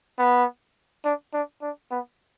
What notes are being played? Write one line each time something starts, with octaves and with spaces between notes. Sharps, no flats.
B3
D4
D4
D4
B3